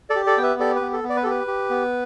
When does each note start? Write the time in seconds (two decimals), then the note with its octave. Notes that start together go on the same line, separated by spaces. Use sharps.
0.10 A4 D5
0.16 G4
0.26 A4 D5
0.38 B3 G5
0.43 B4 E5
0.60 G4 A4 D5
0.76 B4
0.81 B3
0.93 A4
1.04 B3
1.09 D5
1.16 B4
1.23 G4 A4
1.31 B4
1.47 G4
1.70 B3